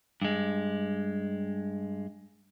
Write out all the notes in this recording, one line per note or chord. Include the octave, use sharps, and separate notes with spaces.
G2 G#3